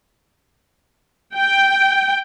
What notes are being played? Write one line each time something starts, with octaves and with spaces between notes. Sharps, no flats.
G5